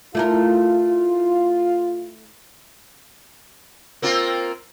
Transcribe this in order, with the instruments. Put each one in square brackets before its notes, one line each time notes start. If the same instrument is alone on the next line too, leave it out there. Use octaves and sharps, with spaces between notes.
[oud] A3 E4 A#4 [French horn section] F4
[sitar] A#3 C4 F4